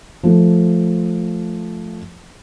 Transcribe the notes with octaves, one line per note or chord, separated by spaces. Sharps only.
F3 A3